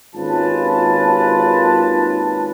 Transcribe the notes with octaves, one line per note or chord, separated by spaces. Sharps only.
G#1 D#2 C#4 F4 B4 A5